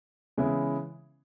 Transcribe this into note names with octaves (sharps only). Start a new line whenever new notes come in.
C#3 E3 G#3 B3 E4